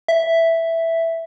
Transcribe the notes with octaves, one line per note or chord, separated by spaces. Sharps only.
E5